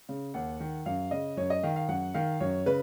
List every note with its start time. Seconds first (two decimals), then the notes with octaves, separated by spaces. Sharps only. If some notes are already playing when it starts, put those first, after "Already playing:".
0.09 C#3
0.34 D#2 F#5
0.60 D#3
0.86 F#2 F5
1.11 C#3 D#5
1.37 F#2 C#5
1.50 D#5
1.63 D#3 F5
1.76 F5
1.88 F#2 F#5
2.14 D#3 F5
2.40 F#2 C#5
2.66 C#3 B4